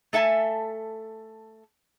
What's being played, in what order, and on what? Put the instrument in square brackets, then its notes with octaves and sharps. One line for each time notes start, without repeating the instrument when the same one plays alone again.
[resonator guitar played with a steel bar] A3 A4 E5 G#5 A5